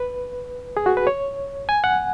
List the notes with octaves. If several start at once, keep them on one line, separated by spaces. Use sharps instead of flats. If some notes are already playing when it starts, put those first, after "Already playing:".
Already playing: B4
G#4
F#4
B4
C#5
G#5
F#5